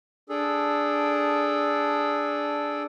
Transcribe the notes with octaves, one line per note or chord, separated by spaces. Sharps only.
D4 G#4 A4